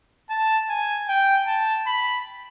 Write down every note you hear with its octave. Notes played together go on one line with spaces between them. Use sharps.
A5
G#5
G5
A5
B5